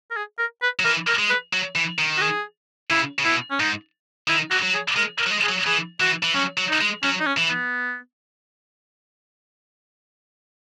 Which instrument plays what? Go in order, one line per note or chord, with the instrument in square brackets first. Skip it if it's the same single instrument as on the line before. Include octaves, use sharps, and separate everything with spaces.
[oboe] A#4
G#4
A#4
B4
[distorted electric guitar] F#3
[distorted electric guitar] E3 [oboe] A#4
[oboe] A#4
[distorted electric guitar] G#3
[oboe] B4
[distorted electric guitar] F#3
E3
D#3
[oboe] F#4
G#4
[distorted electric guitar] C#3 [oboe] E4
[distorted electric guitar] C#3
[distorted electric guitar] B2 [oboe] E4
[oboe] C#4
[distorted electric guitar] G#2 [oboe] D#4
[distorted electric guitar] D#3 [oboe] E4
[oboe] F#4
[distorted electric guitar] F#3
[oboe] G#4
[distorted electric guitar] G#3 [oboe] A#4
[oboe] A#4
[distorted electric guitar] F#3
G#3
[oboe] G#4
[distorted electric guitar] F#3
[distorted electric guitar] E3 [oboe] G#4
[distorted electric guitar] E3 [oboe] F#4
[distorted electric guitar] E3
[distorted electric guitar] F#3 [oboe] C#4
[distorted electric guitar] F#3
[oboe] D#4
[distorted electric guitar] G#3
[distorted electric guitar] F#3 [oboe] C#4
[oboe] D#4
C#4
[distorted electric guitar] E3
[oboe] B3